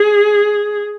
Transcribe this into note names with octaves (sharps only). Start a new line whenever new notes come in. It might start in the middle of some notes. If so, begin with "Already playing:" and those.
Already playing: G#4